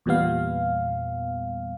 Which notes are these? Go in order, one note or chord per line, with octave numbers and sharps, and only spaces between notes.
E2 A#2 G3 B3 F5